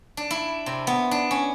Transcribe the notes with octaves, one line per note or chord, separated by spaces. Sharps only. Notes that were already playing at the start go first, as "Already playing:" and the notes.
D4
E4
C3
B3
D4
C#4